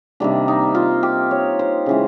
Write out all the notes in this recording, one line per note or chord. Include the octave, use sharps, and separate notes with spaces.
C3 D#3 G3 A#3 D4
D#4
F4
G4
C#5
C5
C#3 E3 G#3